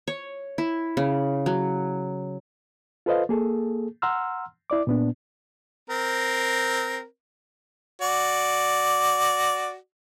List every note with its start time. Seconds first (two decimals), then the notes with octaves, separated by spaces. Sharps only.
0.07 C#5
0.58 E4
0.97 C#3
1.46 F#3
3.06 F4 A4 B4 C5 D#5 F5
3.29 A#3 G#4 A4
4.02 F#5 A#5 C6 E6 F6
4.70 E4 D5 D6
4.87 A#2 B3 D4
5.90 C4 A#4
8.01 F#4 D5